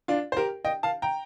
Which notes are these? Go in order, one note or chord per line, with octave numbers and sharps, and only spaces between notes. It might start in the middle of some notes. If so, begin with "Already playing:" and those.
D4 F4
C5
G4 A#4
D#5 G5
F5 A5
G5 A#5